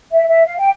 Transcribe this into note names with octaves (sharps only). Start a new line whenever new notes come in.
E5
E5
F5
G5